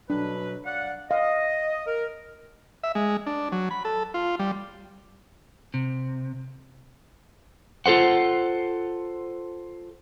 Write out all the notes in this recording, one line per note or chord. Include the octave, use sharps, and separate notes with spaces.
B2 F#3 D4 B4
D5 F5 F#5
D#5 F5
A#4
E5
G#3
D4
F#3
B5
A4
F4
G3
C3
F4 A4 C5 F#5